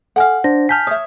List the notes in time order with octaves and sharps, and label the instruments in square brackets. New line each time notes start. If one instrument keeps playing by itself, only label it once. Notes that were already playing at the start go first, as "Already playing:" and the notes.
[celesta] A4 G#5 F6 [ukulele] F5 F#5
[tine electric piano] D4 C5 [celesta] A#6
[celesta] G#5 A5 [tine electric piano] F6 G6 B6
[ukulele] C#5 E5 [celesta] D#6